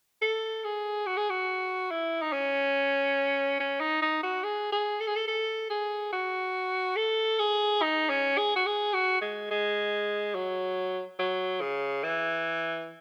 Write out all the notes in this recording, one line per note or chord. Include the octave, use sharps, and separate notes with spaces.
A4
G#4
F#4
G#4
F#4
E4
D#4
C#4
C#4
D#4
D#4
F#4
G#4
G#4
A4
G#4
A4
A4
G#4
F#4
A4
G#4
D#4
C#4
G#4
F#4
G#4
F#4
G#3
G#3
F#3
F#3
C#3
E3